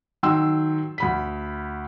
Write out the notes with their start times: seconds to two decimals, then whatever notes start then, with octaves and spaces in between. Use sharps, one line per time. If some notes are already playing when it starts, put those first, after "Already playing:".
0.23 D#3 F#3 G5 C6 E6
0.98 D2 B5 B6